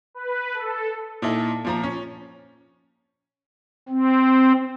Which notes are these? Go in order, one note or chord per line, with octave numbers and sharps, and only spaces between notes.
B4
A4
A#2 D#4 E4 A4
A#2 F3 A#5
C#4
C4